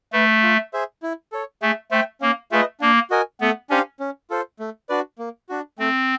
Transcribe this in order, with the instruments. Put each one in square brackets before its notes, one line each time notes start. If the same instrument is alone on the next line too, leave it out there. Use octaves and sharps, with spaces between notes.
[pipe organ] A3 [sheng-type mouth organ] B4 E5
[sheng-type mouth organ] F4
G#4 C5 E5
E4
A4 C#5
[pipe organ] A3 [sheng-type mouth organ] G#4
[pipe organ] A3 [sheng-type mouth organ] C5 E5 G5
[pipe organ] A#3 [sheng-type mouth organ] C#4
[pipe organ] A3 [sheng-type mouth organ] F4 G#4 B4 D#5
[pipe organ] A#3 [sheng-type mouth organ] D4
[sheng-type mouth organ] F#4 A#4 D#5 G#5
[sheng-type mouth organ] A3 [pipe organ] B3
[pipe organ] C#4 [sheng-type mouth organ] D4 G4 C5 F5
[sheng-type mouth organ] C#4
F4 A4 C5
A3
D4 F#4 B4 D5
A#3
D4 F#4
[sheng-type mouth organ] A3 [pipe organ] C4